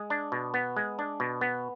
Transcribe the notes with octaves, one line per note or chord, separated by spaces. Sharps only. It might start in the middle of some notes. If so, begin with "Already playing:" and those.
Already playing: G#3
D4
B2
B3
G#3
D4
B2
B3